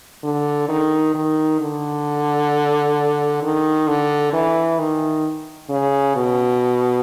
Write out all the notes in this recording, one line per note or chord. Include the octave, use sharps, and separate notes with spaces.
D3
D#3
D#3
D3
D#3
D3
E3
D#3
C#3
B2